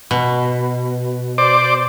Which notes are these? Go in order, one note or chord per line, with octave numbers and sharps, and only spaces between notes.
B2
C5 D5 D6